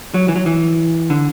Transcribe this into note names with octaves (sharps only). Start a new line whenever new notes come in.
F#3
E3
F#3
E3
D3